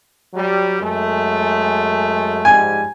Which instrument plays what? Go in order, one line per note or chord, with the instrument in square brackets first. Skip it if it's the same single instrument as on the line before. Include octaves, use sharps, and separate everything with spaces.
[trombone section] F#3 G3
F#2 G#3 A3
[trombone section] G#2 F3 G3 [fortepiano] G#5